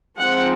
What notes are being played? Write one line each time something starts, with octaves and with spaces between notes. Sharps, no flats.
F3 G#3 C4 D#4 F#5